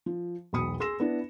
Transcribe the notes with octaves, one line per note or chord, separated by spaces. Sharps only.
F3
E1 B1 B5 D#6 C#7
G#4 C6 E6 A#6 E7
B3 D4 E4